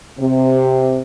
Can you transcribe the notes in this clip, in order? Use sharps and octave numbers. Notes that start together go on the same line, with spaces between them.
C3